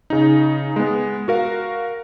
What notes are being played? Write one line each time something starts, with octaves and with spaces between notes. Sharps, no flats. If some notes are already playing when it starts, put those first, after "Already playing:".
C#3 D#4
G#3 B3
F#4 A#4 F5